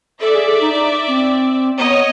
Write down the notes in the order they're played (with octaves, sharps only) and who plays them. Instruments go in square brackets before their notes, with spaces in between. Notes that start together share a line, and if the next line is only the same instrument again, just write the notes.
[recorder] A4 [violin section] D5 E5
[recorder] G#4
A4
D#4
D#4
C4
[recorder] B3 [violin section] C#5 D#5